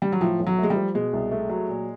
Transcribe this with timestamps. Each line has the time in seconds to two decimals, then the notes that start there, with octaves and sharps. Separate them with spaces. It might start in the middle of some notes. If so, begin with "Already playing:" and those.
0.02 G3
0.12 F#3
0.21 A2 F3
0.40 B1
0.46 F#3
0.58 G#3 A3
0.70 G3
0.76 F3
0.95 B2 G#3
1.13 C2
1.31 A3
1.49 F#3
1.68 A#2